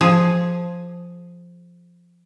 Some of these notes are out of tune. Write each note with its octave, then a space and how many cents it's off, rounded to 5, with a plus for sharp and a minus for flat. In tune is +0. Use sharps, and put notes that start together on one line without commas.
F3 +0 G#4 +0